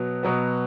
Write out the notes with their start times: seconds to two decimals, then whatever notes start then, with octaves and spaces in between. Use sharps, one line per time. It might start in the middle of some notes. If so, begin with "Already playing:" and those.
Already playing: B2 F#3 B3
0.23 B2 F#3 B3